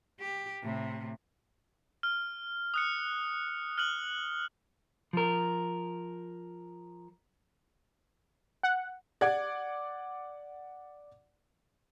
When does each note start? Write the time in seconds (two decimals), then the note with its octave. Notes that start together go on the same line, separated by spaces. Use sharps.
0.20 G4
0.62 A2 C3
2.03 F6
2.74 D#6 F#6 C#7
3.78 F6 F#6 F#7
5.13 F3 A#4
8.63 F#5
9.21 D5 F#5 D6 G#6